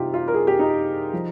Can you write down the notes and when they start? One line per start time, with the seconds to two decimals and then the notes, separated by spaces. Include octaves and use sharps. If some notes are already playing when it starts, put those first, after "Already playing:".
Already playing: C3 G3 D#4 F4 G4
0.14 F4
0.28 A#4
0.34 G#4
0.47 G4
0.59 D#4
1.13 F3